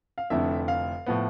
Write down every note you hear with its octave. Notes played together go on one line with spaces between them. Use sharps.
F5
F1 F2 D3 A3 E4 E5
F5
A2 F3 B3